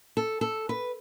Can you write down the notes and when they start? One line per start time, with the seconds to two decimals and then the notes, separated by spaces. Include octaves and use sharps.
0.17 A4
0.41 A4
0.69 B4